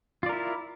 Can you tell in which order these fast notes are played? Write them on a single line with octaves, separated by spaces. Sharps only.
F4 D5 A#4 E4